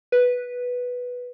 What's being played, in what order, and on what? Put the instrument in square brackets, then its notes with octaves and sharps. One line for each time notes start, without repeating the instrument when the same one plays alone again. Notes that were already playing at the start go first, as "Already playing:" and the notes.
[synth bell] B4